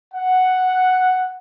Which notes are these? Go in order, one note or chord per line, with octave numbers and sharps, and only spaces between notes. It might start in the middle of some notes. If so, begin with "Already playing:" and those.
F#5